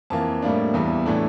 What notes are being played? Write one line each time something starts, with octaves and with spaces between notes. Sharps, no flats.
F2 E3 A#3 A5
A2 G3 A#3 D4
E2 E3 G3
A2 E3 A3 D4